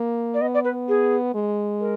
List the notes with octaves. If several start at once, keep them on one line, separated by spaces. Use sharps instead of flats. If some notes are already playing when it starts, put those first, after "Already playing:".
Already playing: A#3
D5
B3 D#5
D5
B4
G#4
G#3
A#4